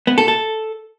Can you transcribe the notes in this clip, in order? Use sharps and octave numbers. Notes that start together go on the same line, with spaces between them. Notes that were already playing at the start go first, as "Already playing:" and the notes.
B3
A4
A4